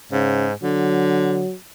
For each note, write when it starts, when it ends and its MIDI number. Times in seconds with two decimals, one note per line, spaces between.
0.12 0.53 44
0.12 0.47 49
0.63 1.43 50
0.63 1.54 54